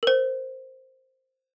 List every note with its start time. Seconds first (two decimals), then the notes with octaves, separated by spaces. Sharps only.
0.03 A#4 C5